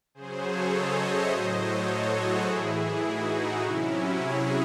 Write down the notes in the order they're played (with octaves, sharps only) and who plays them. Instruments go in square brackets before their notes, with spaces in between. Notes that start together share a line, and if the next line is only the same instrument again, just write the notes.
[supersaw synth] C#3 F#3 G#4 C5
A4 C#5
C5 D#5
C#5 E5
A2 F#3 C5 D#5
A4 C#5
F#4 A4
E4 G#4
A2 E3
E4 G#4
D#4 F#4
C3 F#3 C#4 E4
E4 G#4